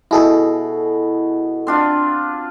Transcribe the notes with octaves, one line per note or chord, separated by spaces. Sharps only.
B2 E4 G#4 A4
C4 D4 F4